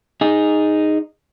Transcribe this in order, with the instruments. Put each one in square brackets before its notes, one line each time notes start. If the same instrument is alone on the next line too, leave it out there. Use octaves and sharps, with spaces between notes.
[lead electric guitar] D#4 G#4